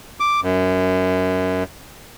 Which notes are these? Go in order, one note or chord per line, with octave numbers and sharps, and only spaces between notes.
D6
F#2